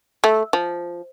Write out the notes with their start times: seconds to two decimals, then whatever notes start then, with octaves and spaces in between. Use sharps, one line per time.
0.24 A3
0.53 F3